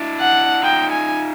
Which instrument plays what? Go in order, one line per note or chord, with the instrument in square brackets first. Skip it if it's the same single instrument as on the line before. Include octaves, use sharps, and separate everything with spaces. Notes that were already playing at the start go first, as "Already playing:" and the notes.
Already playing: [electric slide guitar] D4 E4
[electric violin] F#5
[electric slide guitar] D#4 F4 [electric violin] G5
[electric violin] G#5